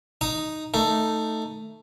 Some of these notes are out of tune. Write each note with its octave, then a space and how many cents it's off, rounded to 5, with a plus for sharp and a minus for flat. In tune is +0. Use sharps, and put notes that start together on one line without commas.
D#4 +0 D#6 +0
A3 +10 D#4 +0